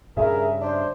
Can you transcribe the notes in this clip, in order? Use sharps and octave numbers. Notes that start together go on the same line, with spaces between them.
G2 C#3 G#4 A#4 E5
G#3 D4 C5